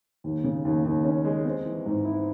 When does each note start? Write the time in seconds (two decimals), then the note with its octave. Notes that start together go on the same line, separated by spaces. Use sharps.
0.24 D#2
0.44 C#3
0.65 D#2
0.85 D#2
1.05 C#4
1.25 G#3
1.45 C4
1.66 E3
1.86 G#2
2.05 E4